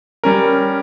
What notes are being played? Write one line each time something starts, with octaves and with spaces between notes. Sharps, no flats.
G3 C#4 A#4